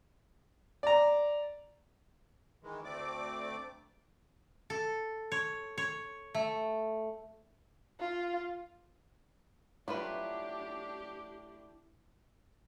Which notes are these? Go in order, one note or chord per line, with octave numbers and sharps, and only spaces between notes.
D5 A#5
D#3 E3 G#3
D2 A3 C4 D5 D6
A4
C#5
C#5
A3
F4
F#3 A3 D4 E4 F4 G4 B4 G5